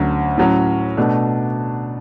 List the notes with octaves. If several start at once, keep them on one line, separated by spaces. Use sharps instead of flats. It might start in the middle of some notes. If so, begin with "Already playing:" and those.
Already playing: D2 D3 F#3 C#4
A2 F#3 C#4
B2 A3 D4